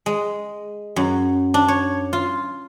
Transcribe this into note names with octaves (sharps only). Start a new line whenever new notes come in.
G#3
F#2
D4
C#5
F4